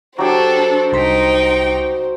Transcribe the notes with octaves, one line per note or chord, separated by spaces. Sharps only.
F#3 D4 G4 A4 C5
C2 D#4 G5 C6 B6